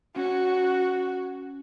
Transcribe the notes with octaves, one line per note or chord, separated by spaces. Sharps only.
C#4 F#4 C#5